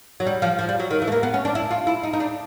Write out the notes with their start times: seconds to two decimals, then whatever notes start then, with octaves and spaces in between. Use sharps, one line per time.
0.20 F#3
0.26 G3
0.42 F3
0.59 F3
0.69 G3
0.80 F#3
0.91 D#3
1.02 E3
1.07 A3
1.12 A#3
1.23 B3
1.34 C#4
1.45 D4
1.55 E4
1.71 F4
1.87 E4
2.03 D#4
2.13 D#4
2.20 D4